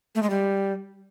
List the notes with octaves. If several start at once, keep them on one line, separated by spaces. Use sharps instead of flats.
A3
G#3
G3